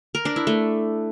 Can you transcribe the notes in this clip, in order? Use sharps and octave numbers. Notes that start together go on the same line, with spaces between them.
A#4
D4
E4
A3